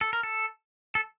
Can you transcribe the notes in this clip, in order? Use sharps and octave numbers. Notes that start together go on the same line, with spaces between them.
A4
A#4
A4
A4